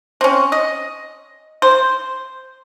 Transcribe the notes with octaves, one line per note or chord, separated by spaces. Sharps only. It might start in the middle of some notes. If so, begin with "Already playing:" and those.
C4 C#4
D#5
C5